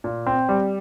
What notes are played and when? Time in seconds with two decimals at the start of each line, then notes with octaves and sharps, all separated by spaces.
0.04 A#2
0.26 C4
0.49 G3